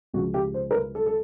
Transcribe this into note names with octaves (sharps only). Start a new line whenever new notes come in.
C#2 C#3 F3 F#4
G4
C5
A#4
B4
A4
A4